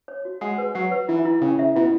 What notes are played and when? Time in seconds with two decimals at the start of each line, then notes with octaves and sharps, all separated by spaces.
0.08 C#5
0.25 F#4
0.41 G#3 F#5
0.58 B4
0.75 F#3 F#5
0.92 B4
1.08 E3 E4
1.25 E4
1.41 C#3 C#4
1.59 E5
1.76 B2 E4